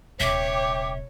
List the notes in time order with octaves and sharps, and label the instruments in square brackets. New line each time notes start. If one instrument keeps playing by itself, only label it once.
[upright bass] D#1 C3 [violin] C#5 [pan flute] E5 [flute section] G5 D6